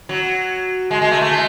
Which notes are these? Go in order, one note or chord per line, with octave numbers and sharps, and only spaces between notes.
F#3
G#3
G#3
A3
A3
G#3